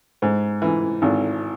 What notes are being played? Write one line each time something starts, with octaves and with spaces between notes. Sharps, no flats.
G#2
E3
G#1